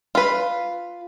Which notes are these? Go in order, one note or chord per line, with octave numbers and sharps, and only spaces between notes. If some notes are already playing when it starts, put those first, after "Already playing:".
F4 B4